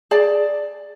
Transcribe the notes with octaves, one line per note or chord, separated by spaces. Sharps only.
G#4 D5 A5